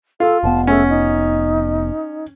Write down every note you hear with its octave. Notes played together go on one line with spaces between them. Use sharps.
F4 A4
F1 B3 A5
A3 C#4
D#4